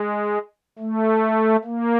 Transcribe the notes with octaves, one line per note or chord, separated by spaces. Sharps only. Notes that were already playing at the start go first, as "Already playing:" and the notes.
Already playing: G#3
A3
A#3